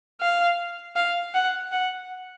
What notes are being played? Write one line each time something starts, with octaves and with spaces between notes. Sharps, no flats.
F5
F5
F#5
F#5